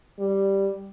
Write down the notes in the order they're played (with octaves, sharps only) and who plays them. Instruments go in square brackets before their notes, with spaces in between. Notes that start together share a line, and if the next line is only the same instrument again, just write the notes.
[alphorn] G3